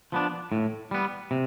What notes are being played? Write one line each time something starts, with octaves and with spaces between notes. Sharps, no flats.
F3 B3 D4
A2
G3 B3
C3